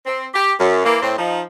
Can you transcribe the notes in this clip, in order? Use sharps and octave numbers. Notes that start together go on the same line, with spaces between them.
C4
G4
F#2
E3 A#3
A2 C4
F3 D#4